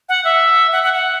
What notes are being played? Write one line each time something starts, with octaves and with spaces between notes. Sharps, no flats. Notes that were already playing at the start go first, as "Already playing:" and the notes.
F#5
E5
F#5
F#5
F#5